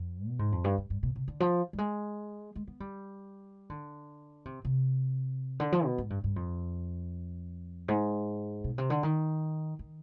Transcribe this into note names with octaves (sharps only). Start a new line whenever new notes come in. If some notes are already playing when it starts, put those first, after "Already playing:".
Already playing: F2
B2
G#2
F2
G2
G2
G2
B2
C3
D3
F3
G3
G#3
G#3
B3
G3
D3
C3
C3
D3
F3
B2
G#2
G2
G2
F2
G#2
B2
C3
D3
D#3
D#3